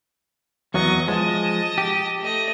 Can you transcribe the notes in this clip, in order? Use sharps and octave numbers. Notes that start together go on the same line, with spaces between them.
E2 F#3 B3 D#5 C#6
F3 G#3 D#5 A5
G4
A3 D#5